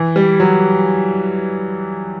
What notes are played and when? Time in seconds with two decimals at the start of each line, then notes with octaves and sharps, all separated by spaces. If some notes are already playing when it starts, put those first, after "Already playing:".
Already playing: E3
0.16 G3
0.40 F#3